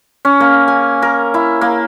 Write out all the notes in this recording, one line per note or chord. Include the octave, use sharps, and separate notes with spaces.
C#4
A#3
G#5
A#4
E4
A#3